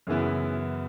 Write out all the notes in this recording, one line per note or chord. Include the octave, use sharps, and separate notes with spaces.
F#2 C#3 E3 B3 E4